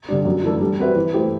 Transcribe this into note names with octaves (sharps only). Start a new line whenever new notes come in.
D3 G3 D4
F#2
E3 A3 D4 A4
G3
C4 F#4 B4 E5
E3
A3 E4 G4 C5